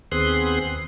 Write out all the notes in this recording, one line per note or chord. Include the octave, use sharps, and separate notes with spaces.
D#2 B3 C4 G#4 C6 F#6